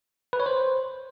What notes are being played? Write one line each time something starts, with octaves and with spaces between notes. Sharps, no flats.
B4
C#5
C5